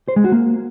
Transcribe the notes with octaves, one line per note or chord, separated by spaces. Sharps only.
C5
G#3
F#4
A#3